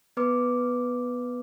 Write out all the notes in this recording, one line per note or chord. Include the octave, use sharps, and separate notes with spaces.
B3 B4 D6